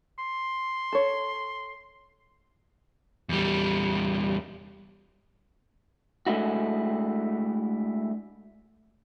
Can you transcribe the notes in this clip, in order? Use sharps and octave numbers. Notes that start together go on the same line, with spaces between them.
C6
A4 C#5
E2 G3
G#3 A3 D4 E4 F#4